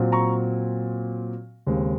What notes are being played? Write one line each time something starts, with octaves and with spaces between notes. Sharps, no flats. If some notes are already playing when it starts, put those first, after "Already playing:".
Already playing: A#2 F#3 C4
A#5 C#6
D#2 C#3 G#3 C4